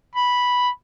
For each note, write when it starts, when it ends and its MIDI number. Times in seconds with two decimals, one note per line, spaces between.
0.15 0.68 83